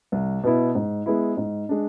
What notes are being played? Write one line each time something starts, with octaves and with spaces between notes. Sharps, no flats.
C2
B2 B3 E4
G#2
G#3 B3 E4
G#2
G#3 D4